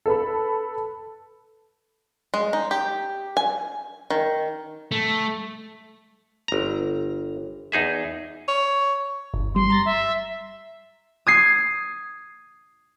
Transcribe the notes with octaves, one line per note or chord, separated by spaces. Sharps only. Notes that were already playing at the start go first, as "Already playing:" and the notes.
A4 B4 B5
G#3
D#4
G4
G#5
D#3
A3
G1 A#5
E2 D#4 G#4 E5
C#5
G1
G2 G3 C6
A#5 A6 A#6
E5
D#6 G#6 C7